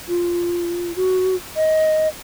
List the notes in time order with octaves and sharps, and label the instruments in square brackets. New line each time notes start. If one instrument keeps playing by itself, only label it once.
[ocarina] F4
F#4
D#5